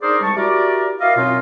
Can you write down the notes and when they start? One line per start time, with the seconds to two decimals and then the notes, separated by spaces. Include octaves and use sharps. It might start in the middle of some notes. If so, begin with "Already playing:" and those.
0.02 D4 D#4 G#4 A#4 C5 D5
0.22 C2 G3 G#3 A5 C#6
0.36 E4 F#4 G4 A#4 D5
1.00 E4 F#4 A#4 D5 D#5 F5
1.17 F#2 B2 C4 C#4 D#4 F4